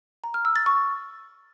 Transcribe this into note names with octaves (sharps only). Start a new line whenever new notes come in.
A#5
F6
E6
A6
C#6